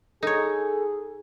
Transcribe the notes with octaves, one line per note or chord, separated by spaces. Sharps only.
D#4 G#4 A4 C#5